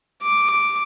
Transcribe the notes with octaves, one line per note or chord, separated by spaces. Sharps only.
D6